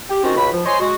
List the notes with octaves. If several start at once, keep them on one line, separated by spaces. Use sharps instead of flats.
G4
D#3 C4 C#4 F4 F#4
C#2 F#4 B5
F3
C5 C#5 D#5 G#5 C6
G#3 F#4